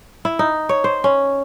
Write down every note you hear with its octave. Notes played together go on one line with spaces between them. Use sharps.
E4
D#4
C#5
C5
C#4